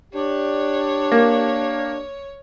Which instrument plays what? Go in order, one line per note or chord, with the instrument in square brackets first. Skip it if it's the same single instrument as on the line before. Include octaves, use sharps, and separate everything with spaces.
[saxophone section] D4 G4 [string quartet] C#5
[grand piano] A#3